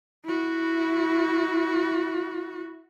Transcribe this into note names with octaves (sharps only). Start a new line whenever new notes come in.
E4 F#4